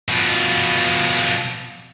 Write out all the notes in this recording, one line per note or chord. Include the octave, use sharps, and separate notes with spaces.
B2 F3